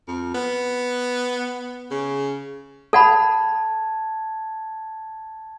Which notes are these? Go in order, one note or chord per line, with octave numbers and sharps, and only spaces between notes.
F2
B3
C#3
A4 F#5 A5 B5 G#6